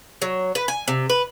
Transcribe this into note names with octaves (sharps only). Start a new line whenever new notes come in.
F#3
B4
G#5
C3
B4